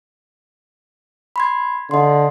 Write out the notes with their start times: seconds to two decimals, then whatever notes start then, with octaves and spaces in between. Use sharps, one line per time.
1.36 B5 C6 G#6
1.91 D3 D#5 C6